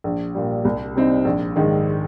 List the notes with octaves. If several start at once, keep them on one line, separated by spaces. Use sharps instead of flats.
A#1
A#2 G3
C2
C3 G3 C4 D#4
A#1
G#2 D#3 G#3